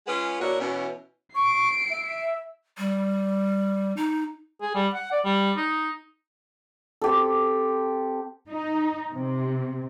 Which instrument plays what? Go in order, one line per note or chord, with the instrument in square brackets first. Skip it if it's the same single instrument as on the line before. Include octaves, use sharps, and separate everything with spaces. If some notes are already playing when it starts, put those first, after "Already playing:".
[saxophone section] G#3 C#4 F4 G#4 B4 F#5
B2 A#3 D4 E4 F#4 C#5
B2 E3 C#4
[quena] C#6 [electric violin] C7 D7
[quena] E5
[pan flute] G3
D#4
[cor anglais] G#4
G3
F#5
D5
G3
D#4
[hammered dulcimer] C4 G4 A4
[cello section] D#4
C3